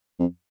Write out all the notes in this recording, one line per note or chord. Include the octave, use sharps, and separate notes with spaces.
F2